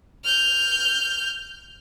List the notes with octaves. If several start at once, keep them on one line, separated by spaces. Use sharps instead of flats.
F6 G6